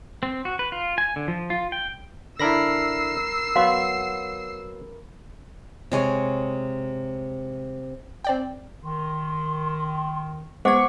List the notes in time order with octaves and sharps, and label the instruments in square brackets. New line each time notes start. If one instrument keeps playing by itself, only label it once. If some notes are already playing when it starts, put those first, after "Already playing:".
[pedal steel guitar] C4
F#4
B4
F4
G#5
D3
F3
F4
G5
[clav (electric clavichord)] D3 D4 E4 [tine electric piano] A#4 B5 A#6 [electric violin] E6 C7
[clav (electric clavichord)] F#3 B3 [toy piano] F5 C6 D6
[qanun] C3 G#3 C#5
[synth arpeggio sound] C4 D5 G5
[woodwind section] D#3 [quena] C6
[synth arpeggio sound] G#3 B3 G#6 [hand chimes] C5 F#5 D6 [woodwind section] C#6